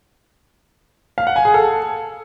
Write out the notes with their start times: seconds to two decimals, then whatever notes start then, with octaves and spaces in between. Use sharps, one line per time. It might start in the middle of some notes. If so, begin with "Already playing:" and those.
1.18 F5
1.27 F#5
1.36 G#5
1.45 G#4
1.54 A4